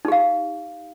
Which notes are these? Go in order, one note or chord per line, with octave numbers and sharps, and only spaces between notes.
D#4 G4 F5